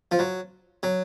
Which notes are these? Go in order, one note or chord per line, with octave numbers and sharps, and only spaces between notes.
F3
F#3
F#3